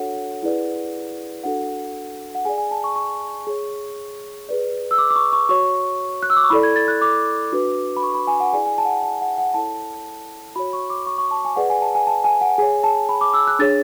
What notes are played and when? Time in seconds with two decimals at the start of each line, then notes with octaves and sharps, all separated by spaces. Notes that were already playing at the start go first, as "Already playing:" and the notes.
Already playing: D4 F#4 A4 C#5 F#5
0.43 E4 G#4 B4 D5
1.44 D4 F#4 A4 F#5
2.35 F#5
2.45 G#4 D5 G#5
2.58 G#5
2.71 A5
2.84 C#6
2.96 C#6
3.47 G#4 C#5
4.49 G#4 B4 D5
4.91 E6
4.98 D6
5.10 D6
5.16 C#6
5.33 C#6
5.49 F#4 C#5 C#6
6.23 F#6
6.30 E6
6.36 D6
6.44 C#6
6.50 E4 A4 D5 B5
6.63 G#6
6.76 A6
6.88 F#6
7.01 D6
7.52 D4 F#4 B4
7.97 B5
8.03 C#6
8.15 B5
8.27 G#5
8.40 F#5
8.53 E4 G#4 D5 G#5
8.66 G#5
8.78 A5
8.85 F#5
8.92 G#5
9.04 A5
9.21 F#5
9.38 F#5
9.54 E4 A4 C#5 A5
10.56 F#4 C#5 B5
10.73 C#6
10.90 D6
11.07 C#6
11.18 C#6
11.31 A5
11.45 G#5
11.56 G#4 B4 D5 F#5
11.70 G#5
11.82 A5
11.95 G#5
12.07 A5
12.24 G#5
12.41 F#5
12.58 G#4 C#5 G#5
12.84 A5
13.09 B5
13.21 D6
13.34 E6
13.47 F#6
13.59 D4 G#4 C#5 A6